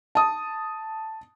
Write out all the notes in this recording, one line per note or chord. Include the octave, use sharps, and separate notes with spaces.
A5 D#6